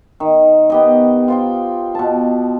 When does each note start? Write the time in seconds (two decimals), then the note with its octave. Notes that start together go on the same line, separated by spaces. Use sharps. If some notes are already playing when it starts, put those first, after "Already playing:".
0.20 D#3
0.70 B3 G4 D#5
1.28 F4 C5 G5
1.95 B2 A5